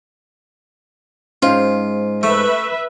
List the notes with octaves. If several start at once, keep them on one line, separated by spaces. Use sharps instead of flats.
G#2 C#4 F4 C5 F5
A3 B4 E5